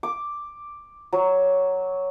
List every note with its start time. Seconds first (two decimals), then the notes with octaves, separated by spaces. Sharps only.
0.03 D6
1.13 F#3